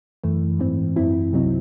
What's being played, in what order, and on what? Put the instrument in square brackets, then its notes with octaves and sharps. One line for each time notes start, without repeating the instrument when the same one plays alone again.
[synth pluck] F#2 E3 A3
G#2 E3 C4
F#2 E3 C4 E4
C2 C3 F#3 C4 D#4